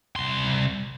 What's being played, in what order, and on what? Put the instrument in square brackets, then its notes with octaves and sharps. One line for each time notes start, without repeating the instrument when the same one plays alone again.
[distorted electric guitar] C2 C6